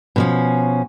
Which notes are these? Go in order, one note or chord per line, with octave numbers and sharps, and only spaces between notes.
B2 F3 C#4